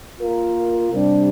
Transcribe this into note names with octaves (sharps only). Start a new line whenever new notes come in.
A#3 F4 A#4
C3 G3 D4